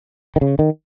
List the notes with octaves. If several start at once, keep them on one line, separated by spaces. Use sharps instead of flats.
D#3
C#3
D#3